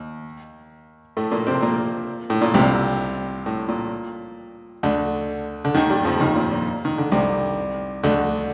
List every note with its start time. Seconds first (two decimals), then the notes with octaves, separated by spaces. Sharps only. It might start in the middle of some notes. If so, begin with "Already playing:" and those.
Already playing: D#2
1.17 A2 A3
1.31 A#2 A#3
1.47 C3 C4
1.62 A#2 A#3
2.30 A2
2.41 A#2
2.54 C2 C3
3.46 A2
3.68 A#2
4.83 D2 D3
5.65 D3
5.74 D#2 D#3
5.90 G2 G3
6.05 F2 F3
6.20 D#2 D#3
6.36 A#2
6.52 A#2
6.85 D#3
6.98 D3
7.12 C2 C3
8.03 D2 D3